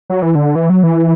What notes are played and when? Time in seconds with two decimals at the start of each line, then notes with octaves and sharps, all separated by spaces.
0.10 F#3
0.22 E3
0.35 D3
0.55 E3
0.70 F#3
0.83 E3